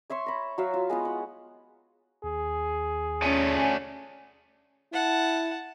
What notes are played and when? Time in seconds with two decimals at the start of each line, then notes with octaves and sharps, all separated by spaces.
0.10 C#5 E5 C6 C#6
0.26 A#5 B5
0.58 F#3 F#4 E5 F5
0.74 F4
0.90 G#3 B3 E4 F4
1.05 F#5
2.24 D#2 G#4
3.22 A3 C#4 D5 G#5
4.93 E4 F#5 A5